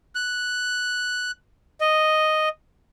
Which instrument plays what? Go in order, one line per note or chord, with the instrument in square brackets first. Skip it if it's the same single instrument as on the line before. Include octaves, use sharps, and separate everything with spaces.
[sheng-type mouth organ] F#6
D#5